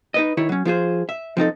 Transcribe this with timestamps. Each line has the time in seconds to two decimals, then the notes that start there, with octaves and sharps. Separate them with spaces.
0.14 D#4 B4 D#5
0.37 D#3 E4 C#5
0.49 F#3 C#4
0.65 F3 F4 G#4 C5
1.09 E5
1.37 F3 C4 D#4 A4